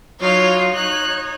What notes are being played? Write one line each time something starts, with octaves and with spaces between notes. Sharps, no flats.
F#3 D#4 F4 C#5
D#4 C#5 F#6